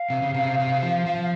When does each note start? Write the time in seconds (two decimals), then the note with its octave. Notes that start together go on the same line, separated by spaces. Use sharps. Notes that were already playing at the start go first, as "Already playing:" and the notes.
Already playing: F5
0.10 C3
0.22 C#3
0.34 C3
0.59 C3
0.82 F3
1.06 F3